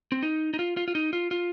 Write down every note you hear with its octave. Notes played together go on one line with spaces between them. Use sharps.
C4
D#4
D#4
F4
F4
F4
D#4
F4
F4